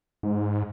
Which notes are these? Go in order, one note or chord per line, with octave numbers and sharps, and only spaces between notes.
G#2